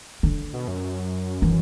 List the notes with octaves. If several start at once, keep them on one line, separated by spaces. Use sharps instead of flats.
D3
B2
F#2
E3